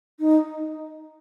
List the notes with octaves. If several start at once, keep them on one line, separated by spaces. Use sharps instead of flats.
D#4